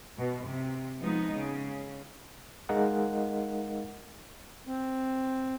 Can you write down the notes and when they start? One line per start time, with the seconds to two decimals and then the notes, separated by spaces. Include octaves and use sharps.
0.18 B2
0.49 C3
1.00 F3 G#3 B3 D#4
1.33 C#3
2.69 G#3 D#4 A#4 D#5 F5 F#5
4.67 C4